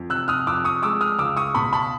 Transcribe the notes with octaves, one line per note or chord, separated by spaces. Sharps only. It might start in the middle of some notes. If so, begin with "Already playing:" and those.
Already playing: F2
C3 E6 F#6
D#6 F6
F2 D6 E6
C#6 D#6
G#3 D6 E6
D#6 F6
C#2 D6 E6
C#6 D#6
B2 B5 C#6
A5 B5